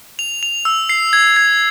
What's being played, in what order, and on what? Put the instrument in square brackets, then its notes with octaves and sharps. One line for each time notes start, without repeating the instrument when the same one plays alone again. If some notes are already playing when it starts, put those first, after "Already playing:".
[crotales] F7
F7
E6
C7
G#6
G#6